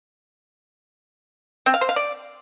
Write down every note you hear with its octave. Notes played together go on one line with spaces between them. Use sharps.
C4
F5
C5
F5
D5